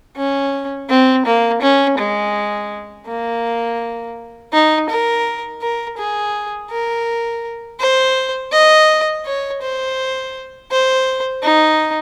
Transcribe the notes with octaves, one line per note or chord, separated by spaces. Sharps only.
C#4
C4
A#3
C#4
G#3
A#3
D#4
A#4
A#4
G#4
A#4
C5
D#5
C#5
C5
C5
D#4